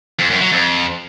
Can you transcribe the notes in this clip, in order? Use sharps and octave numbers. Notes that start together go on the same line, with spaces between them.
F2
F#2
F#3
F2